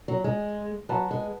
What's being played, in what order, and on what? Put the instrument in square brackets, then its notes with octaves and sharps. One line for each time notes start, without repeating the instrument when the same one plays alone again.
[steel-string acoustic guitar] F#3
G#3
[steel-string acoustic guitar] F#3 [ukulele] B4 F#5 A5
[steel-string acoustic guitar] G#3